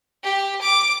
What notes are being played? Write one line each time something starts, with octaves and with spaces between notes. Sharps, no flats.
G4
D6